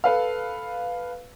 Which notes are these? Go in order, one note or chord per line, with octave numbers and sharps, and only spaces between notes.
A4 B4 F5